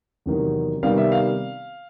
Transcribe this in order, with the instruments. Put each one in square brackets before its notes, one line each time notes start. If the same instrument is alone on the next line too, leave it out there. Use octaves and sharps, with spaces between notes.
[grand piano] E2 C3 D#3 F#3
C3 D#3 G3 B3 F5
E5
F5